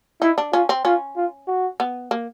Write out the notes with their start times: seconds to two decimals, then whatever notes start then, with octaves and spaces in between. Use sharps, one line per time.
0.22 D#4 E4
0.38 D4
0.53 C#4 F4
0.69 C4
0.85 C#4 F4
1.17 F4
1.48 F#4
1.80 B3
2.11 A#3